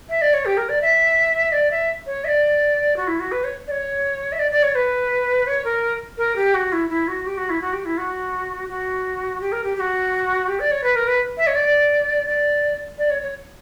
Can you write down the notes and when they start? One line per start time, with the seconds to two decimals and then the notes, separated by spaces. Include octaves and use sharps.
0.09 E5
0.21 D5
0.34 C#5
0.45 G4
0.57 A#4
0.69 D5
0.81 E5
1.52 D5
1.71 E5
2.06 C#5
2.24 E5
2.28 D5
2.96 F#4
3.07 E4
3.20 F#4
3.32 B4
3.44 C#5
3.67 D5
3.71 C#5
4.32 E5
4.39 D5
4.51 D5
4.63 C#5
4.75 B4
5.47 C#5
5.64 A#4
6.17 A#4
6.36 G4
6.54 F#4
6.72 E4
6.89 E4
7.08 F#4
7.26 G4
7.37 F#4
7.49 E4
7.61 F#4
7.73 G4
7.85 E4
7.98 F#4
8.69 F#4
9.41 G4
9.52 A#4
9.64 G4
9.76 G4
9.80 F#4
10.48 G4
10.60 D5
10.71 C#5
10.84 B4
10.96 A#4
11.07 B4
11.37 E5
11.47 C#5
11.55 D5
12.27 D5
12.98 D5
13.10 C#5
13.22 C#5